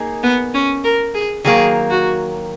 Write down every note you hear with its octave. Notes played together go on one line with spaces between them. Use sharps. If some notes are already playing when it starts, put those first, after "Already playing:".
Already playing: A#3 D#4 G#4
B3
C#4
A#4
G#4
D#3 F#3 A#3 G#4
F#4